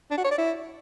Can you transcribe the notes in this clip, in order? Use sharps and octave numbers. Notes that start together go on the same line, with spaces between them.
D4
F#4
C#5
D5
E4